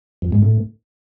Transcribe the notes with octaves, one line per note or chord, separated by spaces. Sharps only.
F2
G#2
A2